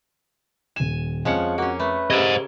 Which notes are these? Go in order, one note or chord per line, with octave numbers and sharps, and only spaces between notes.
D#1 G#5 E7
F2 F3 G#3 C#4 F#5 C#7
A#3 C#4 F#4
A3 B4
C#3 G4 A4 A#4 C5 D#5 G#6